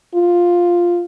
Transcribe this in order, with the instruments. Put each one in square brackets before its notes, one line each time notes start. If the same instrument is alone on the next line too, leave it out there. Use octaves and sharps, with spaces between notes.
[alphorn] F4